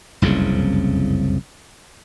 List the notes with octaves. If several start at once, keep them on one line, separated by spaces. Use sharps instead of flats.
F#1 C2 F2 C#3